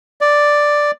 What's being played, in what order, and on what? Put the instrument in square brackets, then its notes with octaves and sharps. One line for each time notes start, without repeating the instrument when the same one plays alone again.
[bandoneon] D5